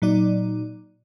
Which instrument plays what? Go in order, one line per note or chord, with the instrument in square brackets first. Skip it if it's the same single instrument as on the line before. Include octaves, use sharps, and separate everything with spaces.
[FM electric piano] A#2 F#3 D#4 D5